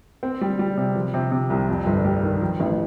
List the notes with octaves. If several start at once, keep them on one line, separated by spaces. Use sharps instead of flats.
C4
G3
G3
C3
F3
C3
C3
C2
F2
G1
G3
D#3
F3
A1